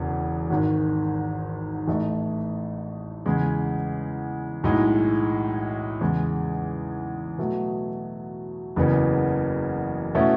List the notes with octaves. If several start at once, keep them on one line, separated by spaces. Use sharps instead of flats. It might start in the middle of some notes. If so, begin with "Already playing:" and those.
Already playing: E1 E2 C#3
G#1 G#2 D#3
A1 A2 E3 A3 D#4
E2 C#3 G#3
B1 A2 G#3 D#4
E2 C#3 G#3
B2 F#3 A3
F#1 E2 C#3 E3 B3
B2 A3 C#4 E4